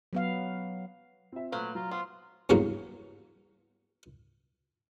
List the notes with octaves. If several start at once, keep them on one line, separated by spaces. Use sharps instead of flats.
F#3 B3 F5
C4 F4 E5
A#2 F#3 A3 B4 C5 F5
F#3 F4 A#5
B3 F4 C5 C6
E2 G2 C#3 F#3 A#3